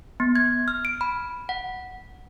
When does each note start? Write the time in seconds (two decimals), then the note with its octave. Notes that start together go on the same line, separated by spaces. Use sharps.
0.20 B3
0.36 G#6
0.68 F6
0.85 D7
1.01 B5
1.49 F#5